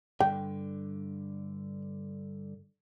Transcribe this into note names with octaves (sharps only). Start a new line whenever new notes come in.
G2 D3 G5